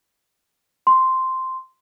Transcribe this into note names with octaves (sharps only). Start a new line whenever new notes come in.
C6